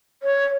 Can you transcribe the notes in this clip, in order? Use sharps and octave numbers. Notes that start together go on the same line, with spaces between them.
C#5